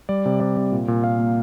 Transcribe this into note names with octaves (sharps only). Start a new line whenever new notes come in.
G3 D5
C3
C3 D5
C3
A#2
A#2
A#2 F5
A#3